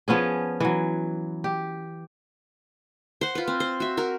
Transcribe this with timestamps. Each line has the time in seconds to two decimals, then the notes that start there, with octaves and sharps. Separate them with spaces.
0.08 F3 B3 C#4 G#4
0.60 E3 F#3
1.44 G4
3.21 C5 F#5
3.35 F4 B4
3.47 C4
3.60 C5
3.80 F#4 E5
3.97 F#4 A#4